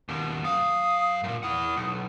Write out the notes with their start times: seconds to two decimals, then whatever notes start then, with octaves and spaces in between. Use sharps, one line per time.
0.09 D#2 B2
0.44 F#2 F5 D#6
1.24 F#2 A#2
1.43 E4 F#5 D#6
1.77 B1